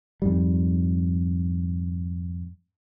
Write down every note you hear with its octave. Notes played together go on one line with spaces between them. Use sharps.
F2 G#2 G3